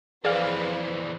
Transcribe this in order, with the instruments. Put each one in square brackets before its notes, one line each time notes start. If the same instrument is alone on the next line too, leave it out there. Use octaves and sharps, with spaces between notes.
[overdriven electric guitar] F2 E3 [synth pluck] G#4 F5 [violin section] B4 C5 [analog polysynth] D5